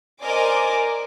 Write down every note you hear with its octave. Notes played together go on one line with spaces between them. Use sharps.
A#4 C5 D5 D#5 G#5 D6